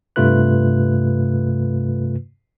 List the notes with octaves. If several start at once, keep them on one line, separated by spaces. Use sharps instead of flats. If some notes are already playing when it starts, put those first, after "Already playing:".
G2 C3 A3 F4 B4 F#6